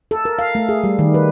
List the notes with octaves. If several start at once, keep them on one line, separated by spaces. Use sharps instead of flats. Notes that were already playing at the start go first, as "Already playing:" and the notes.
A4
A#4
F5
A3
G#4
G3
D#3
B4